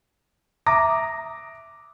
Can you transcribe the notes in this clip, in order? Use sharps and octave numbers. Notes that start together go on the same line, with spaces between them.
E5 A#5 D6 D#6 A#6